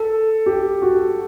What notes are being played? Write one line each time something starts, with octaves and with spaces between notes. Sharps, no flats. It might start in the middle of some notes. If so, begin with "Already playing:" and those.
Already playing: A4
G4
F#4